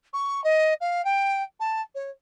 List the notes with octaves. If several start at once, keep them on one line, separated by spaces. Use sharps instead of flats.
C#6
D#5
F5
G5
A5
C#5